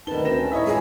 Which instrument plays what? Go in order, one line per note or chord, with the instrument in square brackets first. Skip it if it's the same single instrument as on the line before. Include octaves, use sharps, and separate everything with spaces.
[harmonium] D2 D#3 A5 [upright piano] D3 G7 [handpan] D#4 B4
[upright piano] C4 A#6 E7
[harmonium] C#4
[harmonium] A2 E4 [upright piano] C#5 D#5 E5
[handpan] G#3 F4 [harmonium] E4 [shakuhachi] G#4